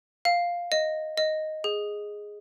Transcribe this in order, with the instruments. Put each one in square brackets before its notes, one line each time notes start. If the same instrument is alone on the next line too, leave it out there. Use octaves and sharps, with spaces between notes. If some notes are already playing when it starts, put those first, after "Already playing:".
[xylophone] F5
D#5
D#5
G#4